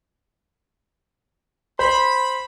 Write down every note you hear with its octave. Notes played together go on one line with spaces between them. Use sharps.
C5 B5